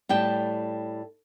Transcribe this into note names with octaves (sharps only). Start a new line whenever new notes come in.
A2 G3 G5 A5